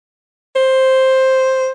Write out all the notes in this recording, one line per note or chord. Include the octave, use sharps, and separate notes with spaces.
C5